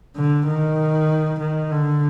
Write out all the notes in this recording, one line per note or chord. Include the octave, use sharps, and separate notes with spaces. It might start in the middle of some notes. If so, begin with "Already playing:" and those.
D3
D#3
D#3
D3